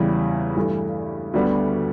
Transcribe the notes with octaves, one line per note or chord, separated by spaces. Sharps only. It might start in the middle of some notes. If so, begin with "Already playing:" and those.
Already playing: E2 C#3 E3 G3
G2 E3 A3
D2 D3 G3 B3